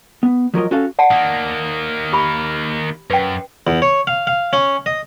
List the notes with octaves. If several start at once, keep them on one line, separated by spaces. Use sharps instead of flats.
B3
F3 F#3 A#4 D#5
C#4 F#4 A4 F5
D5 F#5 A5
D#3 A#3
G4 B5
F#2 B4 G5
E2
C#5
F5
F5
C#4
D#5